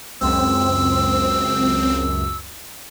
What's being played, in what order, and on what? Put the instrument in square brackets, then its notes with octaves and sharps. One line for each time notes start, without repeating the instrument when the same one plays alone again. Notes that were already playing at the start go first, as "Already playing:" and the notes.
[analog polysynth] C#2 F#2 [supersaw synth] C4 [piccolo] E6